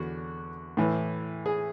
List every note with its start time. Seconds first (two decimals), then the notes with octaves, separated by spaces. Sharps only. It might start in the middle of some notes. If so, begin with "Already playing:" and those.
Already playing: E2 D3 F#4
0.77 A2 E3
1.46 G#4